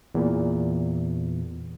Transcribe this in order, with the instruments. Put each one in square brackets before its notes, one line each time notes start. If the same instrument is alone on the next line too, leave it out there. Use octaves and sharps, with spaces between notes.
[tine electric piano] E2 A#2